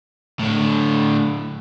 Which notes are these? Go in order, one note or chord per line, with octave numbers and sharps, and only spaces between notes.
A2 D3